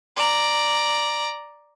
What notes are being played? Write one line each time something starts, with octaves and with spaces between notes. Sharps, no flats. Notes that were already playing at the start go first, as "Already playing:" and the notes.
D5 A#5